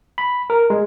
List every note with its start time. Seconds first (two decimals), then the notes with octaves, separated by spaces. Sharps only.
0.18 B5
0.50 A#4
0.70 G#3